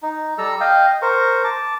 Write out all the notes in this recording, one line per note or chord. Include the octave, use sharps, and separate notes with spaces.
D#4
G3 A4 A#5 E6
D#5 F5 G5
A#4 C5 C#6
A5 D6